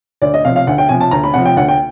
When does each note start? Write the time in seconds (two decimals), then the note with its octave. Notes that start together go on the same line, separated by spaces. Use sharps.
0.22 D2 D5
0.34 D#5
0.44 C3 F3 F5
0.56 F5
0.67 D2 F#5
0.78 G5
0.89 C3 F3 G#5
1.01 A5
1.11 D2 A#5
1.24 B5
1.34 C3 F3 F#5
1.45 G5
1.57 D2 F#5
1.68 G5